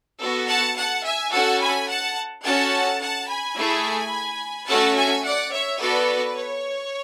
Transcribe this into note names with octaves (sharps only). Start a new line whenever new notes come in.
B3 F#4 A4
F#5 A5
F#5 A5
E5 G#5
C#4 F#4 A4 F#5 A5
G#5 B5
F#5 A5
C#4 F#4 A4 F#5 A5
F#5 A5
G#5 B5
A3 E4 G#4
A3 C#4 F#4 A4 F#5 A5
E5 G#5
D5 F#5
C#5 E5
B3 F#4 A4 B4 D5
C#5